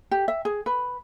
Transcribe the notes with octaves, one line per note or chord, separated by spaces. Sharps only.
G4
E5
G#4
B4